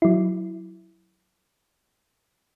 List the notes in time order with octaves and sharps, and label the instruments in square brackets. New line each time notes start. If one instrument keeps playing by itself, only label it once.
[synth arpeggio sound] F#3 E4